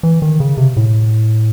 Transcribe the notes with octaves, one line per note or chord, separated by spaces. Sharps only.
E3
D#3
C#3
C3
A2